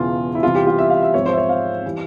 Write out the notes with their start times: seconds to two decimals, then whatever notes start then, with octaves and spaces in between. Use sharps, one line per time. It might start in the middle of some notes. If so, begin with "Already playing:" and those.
Already playing: E1 E2 C#3 E3 F4
0.35 E4
0.43 C2 C3 E3 G3 F4
0.55 G4
0.67 F4
0.79 E5
0.90 F5
1.03 E5
1.14 G#1 G#2 F3 C#5
1.26 C5
1.33 E5
1.38 C#5
1.49 F5
1.86 E3 G3